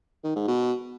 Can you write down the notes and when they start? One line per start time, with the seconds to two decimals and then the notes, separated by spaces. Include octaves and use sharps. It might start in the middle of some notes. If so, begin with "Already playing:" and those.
0.24 D#3
0.36 G#2
0.48 B2